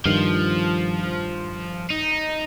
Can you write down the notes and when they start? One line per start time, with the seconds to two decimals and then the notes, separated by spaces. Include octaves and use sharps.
0.05 G2 D#3 F3
1.90 D#4